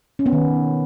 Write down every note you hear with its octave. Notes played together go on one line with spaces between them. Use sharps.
C#4
B3
D#3